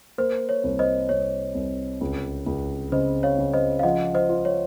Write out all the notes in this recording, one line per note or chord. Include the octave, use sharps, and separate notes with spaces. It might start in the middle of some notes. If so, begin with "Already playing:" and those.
A#3 C5
C#5
C2
C5 D#5
C2 C#5
C2
C#2
C#2
C#3 C5 D#5
C#5 F5
C#3
C5 D#5
F5
F3 D#5 F#5
C5 D#5
F4
C#5